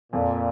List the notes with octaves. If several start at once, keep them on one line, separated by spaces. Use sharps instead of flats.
F2 A#2